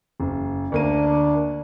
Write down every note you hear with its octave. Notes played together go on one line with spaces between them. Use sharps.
F#1
D2 A#3 D4 D#7